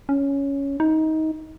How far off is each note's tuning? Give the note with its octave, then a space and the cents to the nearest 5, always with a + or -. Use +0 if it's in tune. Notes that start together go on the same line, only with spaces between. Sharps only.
C#4 +5
D#4 +20